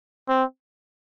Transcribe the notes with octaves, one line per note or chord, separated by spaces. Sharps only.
C4